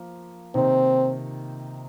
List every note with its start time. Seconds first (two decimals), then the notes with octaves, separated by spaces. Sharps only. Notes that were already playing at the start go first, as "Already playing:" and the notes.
Already playing: F3 A#3 F4
0.55 C3 D#3 A#3 C4 D#4